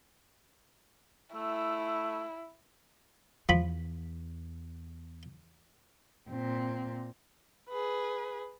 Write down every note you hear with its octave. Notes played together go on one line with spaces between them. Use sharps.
A3 E4
E2 F3 B5
A#2 C4
G#4 B4